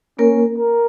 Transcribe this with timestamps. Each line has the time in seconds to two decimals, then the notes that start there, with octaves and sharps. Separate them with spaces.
0.19 A#3 C#4 A#4
0.58 A#4